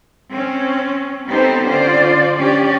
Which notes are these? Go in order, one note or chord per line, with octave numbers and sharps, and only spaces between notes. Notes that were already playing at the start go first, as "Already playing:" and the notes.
C4 C#4
B3 C4 D#4 G4 A4 C5
D3 C#4 F4 C5 D5
C#4 D4 G4 D5